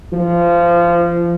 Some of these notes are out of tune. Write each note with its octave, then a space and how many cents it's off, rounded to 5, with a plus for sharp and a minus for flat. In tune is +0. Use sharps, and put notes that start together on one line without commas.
F3 -20